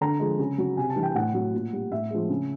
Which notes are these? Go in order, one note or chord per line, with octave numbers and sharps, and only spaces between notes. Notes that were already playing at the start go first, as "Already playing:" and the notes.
D3 A#5
F3 G#3
C#3
F#3
C3 G#5
A5
E3 G3
G5
A2 F#5
F#3
A#2
G3
A2 E5
F3 G#3
C#3